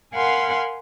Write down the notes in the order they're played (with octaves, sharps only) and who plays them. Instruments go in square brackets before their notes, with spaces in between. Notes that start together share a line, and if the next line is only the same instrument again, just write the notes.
[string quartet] A#4 F5 F#5 G#5 B5 C6